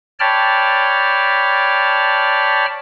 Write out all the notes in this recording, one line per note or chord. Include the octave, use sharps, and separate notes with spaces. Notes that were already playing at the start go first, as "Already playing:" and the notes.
C#5 D5 G5 A5 B5 F6